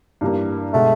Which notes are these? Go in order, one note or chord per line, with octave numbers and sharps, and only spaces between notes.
G2 E3 G3 A#3
B2 G#3 A3